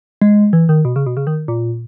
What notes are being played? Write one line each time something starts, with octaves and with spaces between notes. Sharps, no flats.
G#3
E3
D#3
B2
C#3
B2
C#3
D#3
A#2